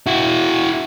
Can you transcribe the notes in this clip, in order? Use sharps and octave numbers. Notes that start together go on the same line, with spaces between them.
E4 F#4